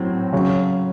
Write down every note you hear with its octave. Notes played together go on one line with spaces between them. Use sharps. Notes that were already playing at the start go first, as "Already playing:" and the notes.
Already playing: A2 F#3 C4
C#3 F#3